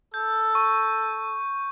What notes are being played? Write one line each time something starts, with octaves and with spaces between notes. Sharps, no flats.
A4 G6
C#6